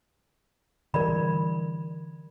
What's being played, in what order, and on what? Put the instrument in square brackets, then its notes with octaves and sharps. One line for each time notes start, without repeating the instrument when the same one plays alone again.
[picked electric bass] D3 E3 G3 [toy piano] A#4 D5 B5